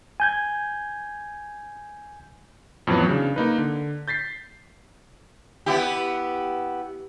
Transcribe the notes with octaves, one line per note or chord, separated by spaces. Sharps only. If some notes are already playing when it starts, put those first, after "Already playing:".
G#5 G6 G#6
F2 A2 E3 F#3 B3
C#3 D4
A#3 D#4 B4
D3
G6 A6 B6 C7
B3 E4 G4